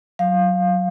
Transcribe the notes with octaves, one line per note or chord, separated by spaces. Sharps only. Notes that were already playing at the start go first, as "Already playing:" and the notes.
F#3 F5